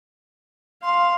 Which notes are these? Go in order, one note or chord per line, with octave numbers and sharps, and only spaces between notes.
F5 C6